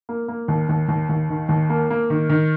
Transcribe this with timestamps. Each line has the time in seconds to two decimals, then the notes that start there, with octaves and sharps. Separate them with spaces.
0.09 A#3
0.28 A#3
0.48 D#2
0.69 D#2
0.89 D#2
1.09 D#2
1.29 D#3
1.49 D#2
1.70 A#3
1.90 A#3
2.10 D#3
2.30 D#3